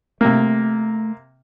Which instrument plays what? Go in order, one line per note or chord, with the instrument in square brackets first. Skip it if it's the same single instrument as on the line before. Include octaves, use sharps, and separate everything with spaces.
[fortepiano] C3 A#3 [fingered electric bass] A3